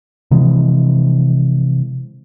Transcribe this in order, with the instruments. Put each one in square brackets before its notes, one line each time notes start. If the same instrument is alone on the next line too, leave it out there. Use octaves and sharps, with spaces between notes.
[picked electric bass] C3 E3 F3 G#3